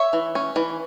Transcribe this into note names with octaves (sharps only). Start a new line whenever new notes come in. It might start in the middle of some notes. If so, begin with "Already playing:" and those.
Already playing: C#5 E5
E3
C#4
E3